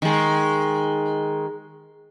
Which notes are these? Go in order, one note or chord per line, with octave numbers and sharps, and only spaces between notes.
D#3 G#3